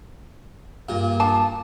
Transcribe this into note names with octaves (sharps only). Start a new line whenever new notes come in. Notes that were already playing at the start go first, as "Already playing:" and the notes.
G2 A#2
D4 F4 A5